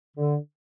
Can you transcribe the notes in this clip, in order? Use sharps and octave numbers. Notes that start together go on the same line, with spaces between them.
D3